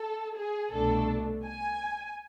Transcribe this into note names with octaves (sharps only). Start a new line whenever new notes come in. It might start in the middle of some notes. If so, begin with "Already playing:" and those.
Already playing: A4
G#4
C2 B2 A3 D4 A4
G#5